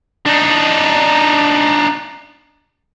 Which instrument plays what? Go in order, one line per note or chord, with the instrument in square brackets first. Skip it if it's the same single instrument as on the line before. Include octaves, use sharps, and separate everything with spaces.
[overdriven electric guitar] D4 D#4